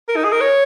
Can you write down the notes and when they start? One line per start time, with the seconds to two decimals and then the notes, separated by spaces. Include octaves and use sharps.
0.09 A#4
0.16 D#4
0.25 G#4
0.33 A#4
0.41 C#5